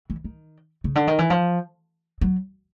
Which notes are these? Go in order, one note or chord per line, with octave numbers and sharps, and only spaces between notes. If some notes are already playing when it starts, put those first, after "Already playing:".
E3
D#3
C#3
D3
D#3
E3
F3
F#3